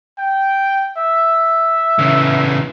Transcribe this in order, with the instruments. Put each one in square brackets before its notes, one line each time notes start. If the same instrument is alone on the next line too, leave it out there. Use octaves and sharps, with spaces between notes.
[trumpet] G5
E5
[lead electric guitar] C#3 E3